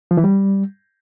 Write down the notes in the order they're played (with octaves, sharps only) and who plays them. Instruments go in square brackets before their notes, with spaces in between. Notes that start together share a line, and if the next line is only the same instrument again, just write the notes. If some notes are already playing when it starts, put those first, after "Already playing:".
[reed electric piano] F3
E3
G3